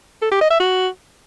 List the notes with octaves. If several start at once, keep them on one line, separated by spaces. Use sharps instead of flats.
A4
G4
D#5
E5
F#4